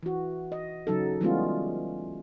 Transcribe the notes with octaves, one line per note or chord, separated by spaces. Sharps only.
E3 F#4
D#5
C#3 F#3 D#4 A4
E3 G3 G#3 B3 C#4 F4